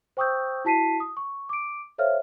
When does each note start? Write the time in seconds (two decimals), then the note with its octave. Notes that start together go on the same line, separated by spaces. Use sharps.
0.17 C5 G5 C#6 D#6 E6 G6
0.65 E4 F#4 A5 B6 C7 D#7
1.00 D#6
1.17 C#6
1.49 D6 D7
1.98 A4 C5 C#5 E5 F5 F6